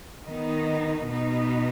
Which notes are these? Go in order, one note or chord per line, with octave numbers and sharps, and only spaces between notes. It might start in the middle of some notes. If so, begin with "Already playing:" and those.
D#3 B3 D#4
B2 B3 D#4